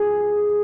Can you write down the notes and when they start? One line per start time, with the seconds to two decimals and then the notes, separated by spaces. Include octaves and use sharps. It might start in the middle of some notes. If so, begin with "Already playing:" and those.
Already playing: G#4